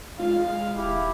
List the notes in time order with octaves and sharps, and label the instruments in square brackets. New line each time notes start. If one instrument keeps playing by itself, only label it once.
[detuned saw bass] G#3 [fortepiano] F4 [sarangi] F5
[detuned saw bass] D#1 [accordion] E4 G4